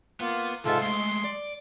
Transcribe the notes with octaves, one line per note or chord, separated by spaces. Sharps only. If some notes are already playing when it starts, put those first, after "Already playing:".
A#3 B3 F4
G#2 C3 F4 A4 E5
G#3 A3 C6
D5